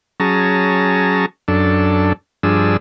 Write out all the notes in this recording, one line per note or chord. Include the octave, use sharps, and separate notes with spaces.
F#3 C#4 G#4 A5 A#5
F#2 D4 A4
G2 F3 D4 G#4 E6